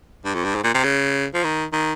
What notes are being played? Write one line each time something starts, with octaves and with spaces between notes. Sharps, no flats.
G2
F2
G2
G#2
A#2
C3
C#3
F3
D#3
D#3